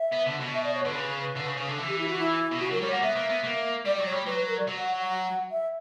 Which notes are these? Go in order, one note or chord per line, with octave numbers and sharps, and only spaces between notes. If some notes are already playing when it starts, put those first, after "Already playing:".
Already playing: E5
B3
D3
B2
E5
D5
C#5
D3 B4
C#3
D3
C#3
C#3
D3
E3
G4
E4
F#4
E4
B2
C#3 F#4
F#3 A#4
G3 C#5
A#3 F#5
B3 E5
A#3
B3
A#3
G3 D5
F#3 D5
C#5
G3
F#3 B4
A#4
D5
F#3
F#5
F#5
E5